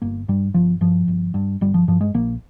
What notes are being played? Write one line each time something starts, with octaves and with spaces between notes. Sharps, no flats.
G1 A#3
G2 G3
G1 F3
G2 F3
G1
G2
G1 G3
F3
G2 F3
G#3
A#1 A#3